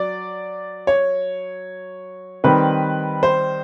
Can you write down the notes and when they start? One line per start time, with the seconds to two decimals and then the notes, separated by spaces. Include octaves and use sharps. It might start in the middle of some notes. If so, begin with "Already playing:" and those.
Already playing: F#3 D5
0.87 C#5
2.44 D#3 G3 C4 B4
3.23 C5